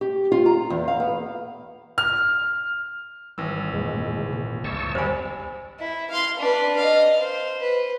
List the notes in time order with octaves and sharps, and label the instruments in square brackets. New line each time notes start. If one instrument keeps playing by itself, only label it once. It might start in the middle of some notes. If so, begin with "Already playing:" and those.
[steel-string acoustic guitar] G4
F4
A#5
E2
F5
B3
[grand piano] F6
[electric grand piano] G#1 E3 E6 [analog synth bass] G3
[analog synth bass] F2 [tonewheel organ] A#2 G#3
[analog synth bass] C#3
[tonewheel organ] A#2
[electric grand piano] G1 [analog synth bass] C#2 [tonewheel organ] A5 C#6 E6
[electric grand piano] G#1 B5 [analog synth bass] E2 [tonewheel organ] G3 [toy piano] C5 G#5
[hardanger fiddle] E4
F5 C6
D4 B4
D#5 F5
C5
B4